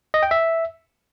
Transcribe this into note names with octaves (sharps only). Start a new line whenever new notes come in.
D#5
G5
E5